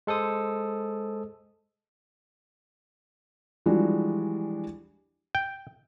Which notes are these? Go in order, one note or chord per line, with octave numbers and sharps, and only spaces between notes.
G#3 A4 C5 D#6
E3 F3 G3 G#3 D4 F#4
G5